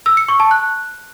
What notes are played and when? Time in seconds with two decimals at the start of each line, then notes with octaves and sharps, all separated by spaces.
0.06 E6
0.17 C#7
0.28 C#6
0.40 A5
0.51 F#6